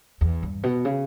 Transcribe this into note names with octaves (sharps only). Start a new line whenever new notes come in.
E2
G2
B2
C#3